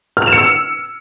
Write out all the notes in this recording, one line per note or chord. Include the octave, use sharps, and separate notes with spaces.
F6
F7
E7
C#7
E6